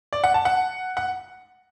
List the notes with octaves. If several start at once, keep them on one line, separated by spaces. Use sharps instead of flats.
D5
F#5
A5
F#5
F#5